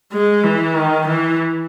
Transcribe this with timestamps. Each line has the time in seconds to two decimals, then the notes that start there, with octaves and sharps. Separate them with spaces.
0.12 G#3
0.44 E3
0.75 D#3
1.08 E3